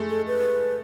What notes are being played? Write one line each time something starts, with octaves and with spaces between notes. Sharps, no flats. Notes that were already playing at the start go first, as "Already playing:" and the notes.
Already playing: G#3 A3
A4
B4